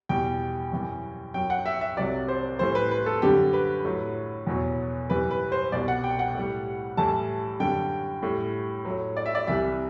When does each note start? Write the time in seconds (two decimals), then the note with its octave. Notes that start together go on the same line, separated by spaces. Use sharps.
0.09 E2 B2 G3 G5
0.72 F#2 E3 G3
1.34 F#2 F#3 G5
1.50 F#5
1.66 E5
1.81 E5
1.97 C2 C3 F#3 D5
2.28 C5
2.59 A2 E3 G3 C5
2.75 B4
2.91 B4
3.06 A4
3.22 F#2 D3 G3 G4
3.53 B4
3.85 A2 F#3
4.47 E2 B2 F#3
5.10 F#2 E3 G3 B4
5.31 B4
5.52 C5
5.72 C2 B2 G3 D5
5.88 F#5
6.04 G5
6.19 F#5
6.34 A2
6.39 G3
6.97 A2 E3 G3 A5
7.60 F#2 D3 G3 G5
8.23 A2 G3
8.85 A2 F#3
9.17 D5
9.26 E5
9.35 D5
9.47 C2 C3 E3 G3 E5